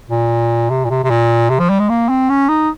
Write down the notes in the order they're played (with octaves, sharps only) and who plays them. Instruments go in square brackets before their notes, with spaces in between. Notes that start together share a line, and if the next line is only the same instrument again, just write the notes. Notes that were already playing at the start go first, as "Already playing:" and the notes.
[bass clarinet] A#2
C3
A#2
C3
C3
A#2
C3
F3
G3
G#3
A#3
C4
C#4
D#4